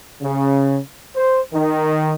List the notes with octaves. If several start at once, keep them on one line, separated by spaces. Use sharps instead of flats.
C#3
C5
D#3